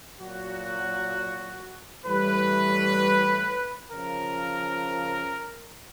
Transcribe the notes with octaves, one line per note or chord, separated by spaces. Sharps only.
A#2 F#3 F#4
A2 E3 G3 B4
C#3 F3 A#4